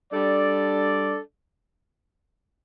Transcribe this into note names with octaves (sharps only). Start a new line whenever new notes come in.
G3 D4 A4 D5